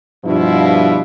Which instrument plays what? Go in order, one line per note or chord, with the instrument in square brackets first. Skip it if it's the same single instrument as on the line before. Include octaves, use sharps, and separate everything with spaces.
[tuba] G2 [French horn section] B2 F3 E4